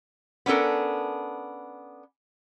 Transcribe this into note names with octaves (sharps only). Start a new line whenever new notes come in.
B3 C#4 D4 A4 A#4